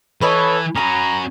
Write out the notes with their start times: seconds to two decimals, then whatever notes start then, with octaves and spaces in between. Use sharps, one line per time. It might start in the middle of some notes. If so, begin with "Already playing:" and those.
0.22 E3 A4 B4 C#5 D#5
0.76 C#4 F#4 A#5 B5 D#6